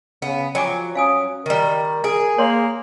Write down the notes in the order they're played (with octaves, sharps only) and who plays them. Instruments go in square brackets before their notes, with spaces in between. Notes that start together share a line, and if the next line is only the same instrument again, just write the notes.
[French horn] C#3 [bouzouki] B3
[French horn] F3 [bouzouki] F#3 [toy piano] G5 G#5 D6
[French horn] C#4 [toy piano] F5 G#5 D#6
[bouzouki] D#3 G3 [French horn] A#4
[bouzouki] G#4 [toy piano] G#5
[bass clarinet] A#3 [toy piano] C#5 C6